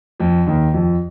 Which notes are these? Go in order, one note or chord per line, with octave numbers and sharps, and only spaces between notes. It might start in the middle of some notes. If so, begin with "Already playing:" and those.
F2 F3
D#2 D#3
F2 F3